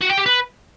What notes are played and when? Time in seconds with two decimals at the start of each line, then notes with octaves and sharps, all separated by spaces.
0.01 F#4
0.09 G5
0.18 G4
0.26 B4